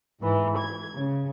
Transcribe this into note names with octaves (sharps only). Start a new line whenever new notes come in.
G#2 E3
G#6
C#3